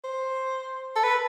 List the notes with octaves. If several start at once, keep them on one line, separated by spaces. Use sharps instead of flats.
C5
A4
B4